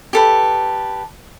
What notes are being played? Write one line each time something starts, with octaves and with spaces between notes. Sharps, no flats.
G4 A4 B4